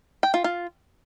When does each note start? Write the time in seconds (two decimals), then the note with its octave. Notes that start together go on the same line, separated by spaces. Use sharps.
0.23 G5
0.34 F4
0.44 F4